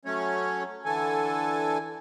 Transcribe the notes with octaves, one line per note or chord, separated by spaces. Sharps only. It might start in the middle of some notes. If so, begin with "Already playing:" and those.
F#3 A3 C#4 C#5
D3 E3 A4 G#5